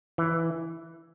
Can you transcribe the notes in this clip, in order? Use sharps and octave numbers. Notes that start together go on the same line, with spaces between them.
E3